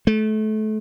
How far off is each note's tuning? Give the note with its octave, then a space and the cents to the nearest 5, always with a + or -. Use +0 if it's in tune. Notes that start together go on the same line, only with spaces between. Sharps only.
A3 -30